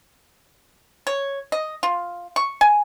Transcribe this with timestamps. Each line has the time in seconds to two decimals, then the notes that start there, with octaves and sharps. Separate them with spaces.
1.07 C#5
1.52 D#5
1.83 F4
2.36 C#6
2.61 G#5